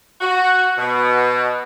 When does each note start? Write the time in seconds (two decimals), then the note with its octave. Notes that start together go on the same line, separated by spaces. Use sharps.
0.21 F#4
0.77 B2